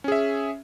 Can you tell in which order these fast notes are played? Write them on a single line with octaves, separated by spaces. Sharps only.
C#4 G#4 E5